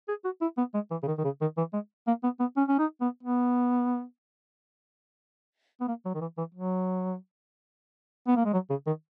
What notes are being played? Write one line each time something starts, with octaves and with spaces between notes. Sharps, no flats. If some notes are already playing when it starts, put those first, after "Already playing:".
G#4
F#4
E4
B3
G#3
E3
C#3
D#3
D#3
C#3
D#3
E3
G#3
A#3
B3
B3
C#4
C#4
D#4
B3
B3
B3
A#3
F#3
D#3
E3
E3
F#3
B3
A#3
G#3
F#3
C#3
D#3